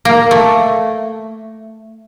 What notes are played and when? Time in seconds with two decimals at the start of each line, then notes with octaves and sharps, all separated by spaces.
0.05 A#3
0.31 A3